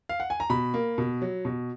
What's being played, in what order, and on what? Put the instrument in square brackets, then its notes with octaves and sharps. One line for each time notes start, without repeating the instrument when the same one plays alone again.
[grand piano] F5
F#5
G#5
A#5
B2 B5
A#3
B2
F#3
B2